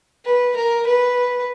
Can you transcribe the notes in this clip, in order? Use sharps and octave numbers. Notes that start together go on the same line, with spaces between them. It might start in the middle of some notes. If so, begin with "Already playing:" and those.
B4
A#4
B4